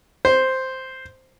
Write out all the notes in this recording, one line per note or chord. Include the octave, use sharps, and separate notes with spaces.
C5